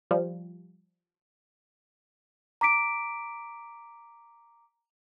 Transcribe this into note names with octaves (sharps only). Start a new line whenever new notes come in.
F3 G3
A#5 D6 B6 D7